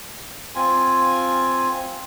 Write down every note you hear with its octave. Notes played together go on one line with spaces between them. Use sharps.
C4 F4 G#5